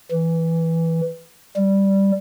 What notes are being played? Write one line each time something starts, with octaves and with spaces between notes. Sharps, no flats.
E3
G3